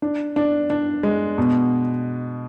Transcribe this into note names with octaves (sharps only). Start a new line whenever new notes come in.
D4
D4
D4
G#3
B2